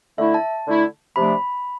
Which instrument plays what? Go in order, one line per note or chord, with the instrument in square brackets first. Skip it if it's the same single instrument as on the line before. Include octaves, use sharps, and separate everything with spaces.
[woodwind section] D3 A3 E4 [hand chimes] E5
[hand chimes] A5
[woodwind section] D3 A3 E4
[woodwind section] C3 F3 A3 D4 [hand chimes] B5